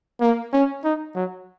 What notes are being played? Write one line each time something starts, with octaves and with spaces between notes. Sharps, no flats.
A#3
C#4
D#4
F#3